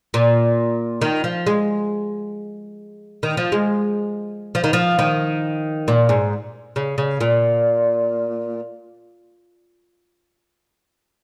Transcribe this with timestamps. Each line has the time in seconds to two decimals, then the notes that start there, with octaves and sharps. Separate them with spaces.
0.14 A#2
1.02 D#3
1.24 F3
1.47 G#3
3.23 D#3
3.37 F3
3.52 G#3
4.55 F3
4.64 D#3
4.73 F3
4.99 D#3
5.88 A#2
6.09 G#2
6.76 C#3
6.98 C#3
7.21 A#2